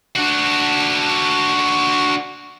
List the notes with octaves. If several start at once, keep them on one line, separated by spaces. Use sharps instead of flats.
D4 F#4